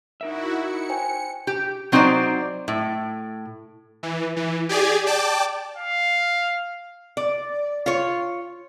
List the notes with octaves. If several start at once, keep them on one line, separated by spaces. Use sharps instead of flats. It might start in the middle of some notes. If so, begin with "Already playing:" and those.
D#4 E4 F#4 A#4 E5
C#7
C5 G5 G#5
G4
F#3 C4 D#4 C5 D5
A2
E3
E3
G4 G#4 D5 G#5
D5 G5 A5 D6
F5
D5
F4 C#5